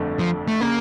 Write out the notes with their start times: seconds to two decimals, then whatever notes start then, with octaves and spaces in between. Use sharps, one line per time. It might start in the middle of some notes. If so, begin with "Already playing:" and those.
Already playing: G1 F2 D3 A3
0.19 F3
0.48 A3
0.61 C#3 A#3